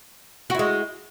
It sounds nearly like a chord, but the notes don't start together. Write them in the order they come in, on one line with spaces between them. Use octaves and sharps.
F#4 E4 G#3